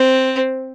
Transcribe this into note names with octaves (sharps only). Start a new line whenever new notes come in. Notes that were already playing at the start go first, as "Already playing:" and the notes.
Already playing: C4